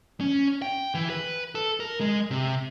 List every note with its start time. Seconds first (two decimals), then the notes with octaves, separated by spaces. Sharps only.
0.21 C#4
0.62 G5
0.94 E3
1.10 B4
1.55 A4
1.80 A#4
2.01 G#3
2.31 C3